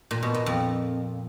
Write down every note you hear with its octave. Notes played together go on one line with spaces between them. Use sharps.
A#2
B2
A#2
F2